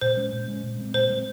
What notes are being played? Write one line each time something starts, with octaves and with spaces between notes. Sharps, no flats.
A#2 C5
G#3 C#4
A#2
G#3 C#4
A#2
G#3 C4
A#2 C5
G#3 C4